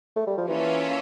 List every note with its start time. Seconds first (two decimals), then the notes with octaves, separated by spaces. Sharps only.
0.16 A3
0.27 G3
0.38 F3
0.48 E3 A#3 C#4 F4 A4 E5